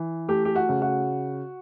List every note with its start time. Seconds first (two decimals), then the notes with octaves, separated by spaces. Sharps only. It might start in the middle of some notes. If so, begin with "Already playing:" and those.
Already playing: E3
0.29 A3 G4
0.45 G4
0.55 F#4
0.69 C#3
0.82 F#4